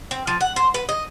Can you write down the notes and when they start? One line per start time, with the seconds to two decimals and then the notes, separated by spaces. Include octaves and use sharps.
0.11 C4
0.27 F3
0.41 F#5
0.56 C5
0.74 B4
0.89 D#5